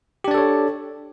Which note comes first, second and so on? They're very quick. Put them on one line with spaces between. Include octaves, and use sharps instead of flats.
G4 D4 D5 A4 C#5